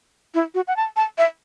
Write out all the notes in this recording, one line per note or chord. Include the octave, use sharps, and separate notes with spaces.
E4
F#4
F#5
A5
A5
E5